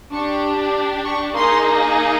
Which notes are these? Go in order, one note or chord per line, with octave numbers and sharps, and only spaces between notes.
D4 G4 C#6
C#6
A#3 D#4 G#4 C6